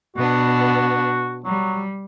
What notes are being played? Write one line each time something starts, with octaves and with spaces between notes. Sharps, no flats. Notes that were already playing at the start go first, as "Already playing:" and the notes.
B2 B3 D4 F#4
F#3 G3